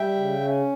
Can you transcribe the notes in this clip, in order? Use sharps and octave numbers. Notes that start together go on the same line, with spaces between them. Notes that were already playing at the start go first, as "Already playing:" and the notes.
Already playing: G3 E5 G5
C#3
C#4